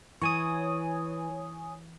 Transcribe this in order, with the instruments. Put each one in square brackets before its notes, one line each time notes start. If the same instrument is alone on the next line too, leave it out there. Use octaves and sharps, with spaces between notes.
[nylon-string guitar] E3 [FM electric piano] C#5 G#5 D#6